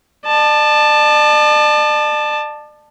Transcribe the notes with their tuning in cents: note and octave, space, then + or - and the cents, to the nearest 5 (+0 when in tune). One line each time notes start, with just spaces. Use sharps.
D5 +40 A5 +0